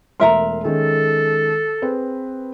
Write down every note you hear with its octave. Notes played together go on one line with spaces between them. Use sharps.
E1 A3 A#4 E5 A#5 C6
D#3 G#3 C#4 A4
C4 G#4 B4